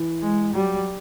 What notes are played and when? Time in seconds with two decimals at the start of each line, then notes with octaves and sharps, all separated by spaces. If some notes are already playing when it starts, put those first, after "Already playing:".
Already playing: E3
0.22 G#3
0.53 F#3 G3